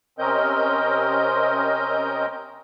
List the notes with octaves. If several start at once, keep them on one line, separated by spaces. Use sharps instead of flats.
C3 C4 C#4 A#4 D#5 G6